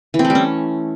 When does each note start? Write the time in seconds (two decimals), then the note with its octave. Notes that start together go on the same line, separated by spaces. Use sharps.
0.14 E3
0.19 C4
0.25 A3
0.30 G3
0.35 C#4